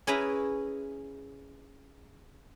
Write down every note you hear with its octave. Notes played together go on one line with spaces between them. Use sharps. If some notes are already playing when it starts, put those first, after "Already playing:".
C#4 E4 G#4 B4 E5 A#5